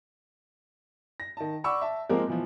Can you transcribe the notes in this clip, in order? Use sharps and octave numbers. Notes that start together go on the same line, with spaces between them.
A#6
D#3 A5
D5 F#5 B5 C#6 D6 E6
E5 A5
F3 G#3 A#3 C4 A#4 D6
B2 E3 F3